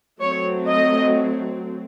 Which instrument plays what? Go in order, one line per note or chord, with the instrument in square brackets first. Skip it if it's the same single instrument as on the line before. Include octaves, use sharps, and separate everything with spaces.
[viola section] F#3 A3 C4 C#5
D#5